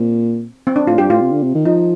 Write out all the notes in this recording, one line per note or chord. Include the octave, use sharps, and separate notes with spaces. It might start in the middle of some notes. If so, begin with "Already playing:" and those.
Already playing: A#2 C4
C4
D4
A2 F4
G2 G4
A2 F4
C3
D3
C3
D#3
F3 D#4